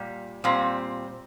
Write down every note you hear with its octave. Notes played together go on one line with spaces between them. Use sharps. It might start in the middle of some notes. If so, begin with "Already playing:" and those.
Already playing: A#2 G3
A#2 G3 C4